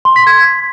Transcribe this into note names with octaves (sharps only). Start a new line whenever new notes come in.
C6
B6
G#6